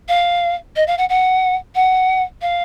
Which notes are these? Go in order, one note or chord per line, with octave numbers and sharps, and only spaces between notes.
F5
D#5
F5
F#5
F#5
F#5
F5